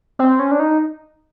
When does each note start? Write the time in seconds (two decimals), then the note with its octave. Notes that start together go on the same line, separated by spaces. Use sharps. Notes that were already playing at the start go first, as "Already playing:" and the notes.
0.19 C4
0.39 C#4
0.51 D4
0.60 D#4